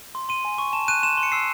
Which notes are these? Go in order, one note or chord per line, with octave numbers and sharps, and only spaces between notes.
C6
C6 D#7
G#5
C#6
A5 E7
F#6 D#7
C6 E7
D#7
C6
C#7
E6 C7